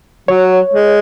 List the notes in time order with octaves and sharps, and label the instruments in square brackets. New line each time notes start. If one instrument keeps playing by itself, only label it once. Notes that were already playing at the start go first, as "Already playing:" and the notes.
[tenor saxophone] F#3 [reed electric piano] C#5
[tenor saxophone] G#3